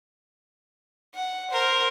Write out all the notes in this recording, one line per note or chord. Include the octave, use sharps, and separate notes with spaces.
F#5
A#4 C5